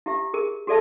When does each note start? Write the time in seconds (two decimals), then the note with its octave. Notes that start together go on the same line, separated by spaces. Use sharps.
0.06 E4 G4 E5
0.34 G#4 A#4
0.67 F#4 G#4 A4 D5 E5 A5